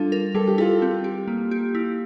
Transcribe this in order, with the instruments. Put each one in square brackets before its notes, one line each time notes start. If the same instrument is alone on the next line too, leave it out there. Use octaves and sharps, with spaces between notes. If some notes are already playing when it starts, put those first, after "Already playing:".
Already playing: [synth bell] G3 D4 [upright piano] F4 A4
[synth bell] A#4
[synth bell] G3 [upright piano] A4
[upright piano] G4
[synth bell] E4 [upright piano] F4 A4
[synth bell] C4
G4
A#3
G4
E4